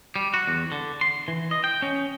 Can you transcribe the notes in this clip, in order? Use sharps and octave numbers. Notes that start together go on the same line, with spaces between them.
G3
F#4
E2
D3
C6
E3
D#5
G5
C#4